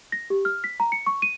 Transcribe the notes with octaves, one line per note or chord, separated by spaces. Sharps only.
A#6
G4
F6
B6
A#5
C#7
C#6
D#7